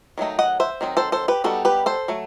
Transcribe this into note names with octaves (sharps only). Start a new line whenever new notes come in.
D#3 F#3 A3 D#4
D#5 F#5
C5 E5
D#3 F#3 C4 D#4
A4 C5
A4 C5
G4 B4
G3 B3 D#4 F#4 A4
G4 B4
A4 C5
F#3 A3